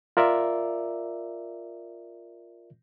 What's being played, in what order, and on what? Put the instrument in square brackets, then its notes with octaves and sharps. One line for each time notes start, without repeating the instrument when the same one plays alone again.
[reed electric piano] F4 A#4 D5 E5